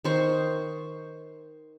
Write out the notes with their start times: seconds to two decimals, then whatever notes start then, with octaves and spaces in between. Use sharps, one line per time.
0.04 D#3 C5 C#6